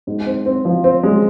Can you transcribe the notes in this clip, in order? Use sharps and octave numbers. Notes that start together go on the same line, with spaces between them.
G#2
C4
C4
F3
C4
G#3